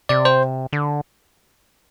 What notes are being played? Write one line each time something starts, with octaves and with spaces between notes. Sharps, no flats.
C3 D5
C5
D3